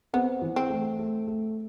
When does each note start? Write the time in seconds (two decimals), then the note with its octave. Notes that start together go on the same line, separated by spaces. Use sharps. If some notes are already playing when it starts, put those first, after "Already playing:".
0.13 B3 C4
0.42 E3
0.56 C4
0.70 A3
0.99 A3
1.28 A3